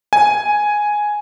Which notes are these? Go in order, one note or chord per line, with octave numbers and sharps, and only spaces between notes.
G#5